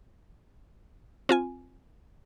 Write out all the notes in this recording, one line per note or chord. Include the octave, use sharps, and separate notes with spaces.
C4 F4 G#5